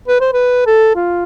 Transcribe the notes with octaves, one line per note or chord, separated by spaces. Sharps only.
B4
C5
B4
A4
F4